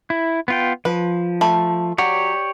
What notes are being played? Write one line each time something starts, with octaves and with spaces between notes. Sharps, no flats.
E4
B3 F4 G5
F3 B4
A3 B5
F#3 G4 C#5 D5